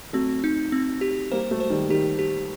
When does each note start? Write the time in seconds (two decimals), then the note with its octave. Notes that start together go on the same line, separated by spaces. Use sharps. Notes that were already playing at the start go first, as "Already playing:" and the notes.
0.13 F#3 A3 C4
0.44 D#4
0.72 C4
1.01 G4
1.31 G3 A#3 C5
1.51 F#3 A3
1.60 C5
1.70 D#3 G3
1.90 D#3 G3 G4
2.19 G4